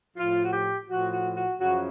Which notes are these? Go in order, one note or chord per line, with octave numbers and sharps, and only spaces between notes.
A2 F3 F4
F#4
G4
A2 F3 F#4
F#4
F#4
F#2 C#3 F3 F#4